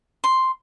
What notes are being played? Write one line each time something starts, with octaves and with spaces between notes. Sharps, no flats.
C6